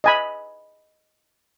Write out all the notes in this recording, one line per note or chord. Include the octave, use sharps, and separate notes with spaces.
D#5 G#5 B5